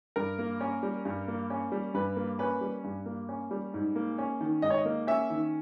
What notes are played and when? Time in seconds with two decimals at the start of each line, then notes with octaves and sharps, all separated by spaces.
0.16 G2 A#4
0.39 A#3
0.61 C#4
0.83 G3
1.05 G2
1.28 A#3
1.50 C#4
1.72 G3
1.94 G2 B4
2.16 A#3
2.39 C#4 B4
2.61 G3
2.84 G2
3.06 A#3
3.29 C#4
3.51 G3
3.74 G#2
3.96 A#3
4.18 C#4
4.41 D#3
4.62 G#2 D#5
4.70 C#5
4.78 D#5
4.85 A#3
5.07 C#4 E5
5.30 D#3